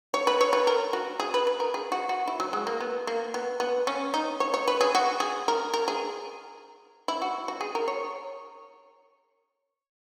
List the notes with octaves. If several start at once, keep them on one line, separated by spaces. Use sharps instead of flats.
C#5
B4
C#5
B4
A#4
F#4
G#4
B4
B4
A#4
G#4
F#4
F#4
E4
F#3
G#3
A#3
B3
A#3
B3
B3
C#4
D#4
C#5
C#5
B4
G#4
F#4
G#4
A#4
A#4
G#4
E4
F#4
F#4
G#4
A#4
C#5